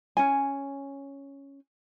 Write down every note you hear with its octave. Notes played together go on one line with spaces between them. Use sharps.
C#4 G#5